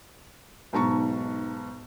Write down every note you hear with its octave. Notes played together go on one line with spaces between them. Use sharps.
B1 G#2 A5 A#5 C#6